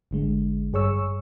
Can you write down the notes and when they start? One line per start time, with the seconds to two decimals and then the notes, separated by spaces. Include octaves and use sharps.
0.11 G#1 D3 G#3
0.73 G2 G#4 C#5 C#6 E6